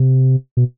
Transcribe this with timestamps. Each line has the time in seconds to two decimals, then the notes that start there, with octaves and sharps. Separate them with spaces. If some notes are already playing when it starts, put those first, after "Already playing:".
Already playing: C3
0.57 B2